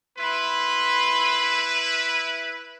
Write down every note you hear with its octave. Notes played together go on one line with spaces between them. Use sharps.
E4 B4 B5 C6